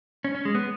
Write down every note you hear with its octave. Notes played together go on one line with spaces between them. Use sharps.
C#4
C#4
G#3
B3